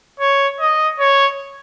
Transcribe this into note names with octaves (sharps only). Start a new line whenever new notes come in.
C#5
D#5
C#5